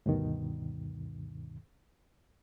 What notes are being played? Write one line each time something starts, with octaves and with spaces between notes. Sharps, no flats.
D2 G2 B2 D#3